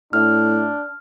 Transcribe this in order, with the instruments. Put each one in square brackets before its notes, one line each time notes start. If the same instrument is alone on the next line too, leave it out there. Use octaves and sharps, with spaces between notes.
[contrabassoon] A2 [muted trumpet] D4 [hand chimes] F6